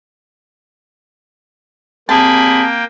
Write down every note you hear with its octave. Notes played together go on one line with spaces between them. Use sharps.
G3 A#3 C4 G#4 G5 A5 B5